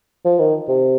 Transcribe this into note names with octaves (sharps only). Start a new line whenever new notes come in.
F3
D#3
C3